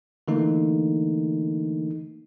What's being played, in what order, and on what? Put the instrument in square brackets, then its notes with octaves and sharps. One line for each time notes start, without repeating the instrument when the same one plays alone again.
[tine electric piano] D3 E3 A3 A#3 D#4